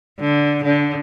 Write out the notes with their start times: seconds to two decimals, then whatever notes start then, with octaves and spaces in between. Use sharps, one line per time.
0.20 D3
0.64 D3